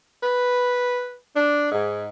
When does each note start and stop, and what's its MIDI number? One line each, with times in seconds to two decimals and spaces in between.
0.21 1.15 71
1.34 1.71 62
1.71 2.08 44